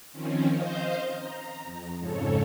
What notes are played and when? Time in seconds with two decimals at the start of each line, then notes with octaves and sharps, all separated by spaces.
0.13 D#3 F3 C4 C#4
0.54 C5 D#5 F5 G6
1.14 A#5
1.64 F2
1.98 F2 G#2 C#3 A4 C#5